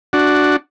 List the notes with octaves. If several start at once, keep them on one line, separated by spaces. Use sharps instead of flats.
D4 F#4